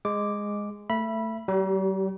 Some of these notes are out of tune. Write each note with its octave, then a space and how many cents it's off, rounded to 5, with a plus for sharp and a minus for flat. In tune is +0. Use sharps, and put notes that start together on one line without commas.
G#3 -10 D6 +0
A3 +15 E5 +25 B5 -15
G3 -45 G4 -15